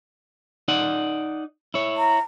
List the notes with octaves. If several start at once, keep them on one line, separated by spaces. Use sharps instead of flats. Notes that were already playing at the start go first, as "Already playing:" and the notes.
D#4 D5 F#5
E4 C#5
A#5